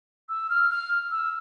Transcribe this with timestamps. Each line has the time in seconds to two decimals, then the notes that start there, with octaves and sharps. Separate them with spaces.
0.29 E6
0.50 F6
0.70 F6
1.11 E6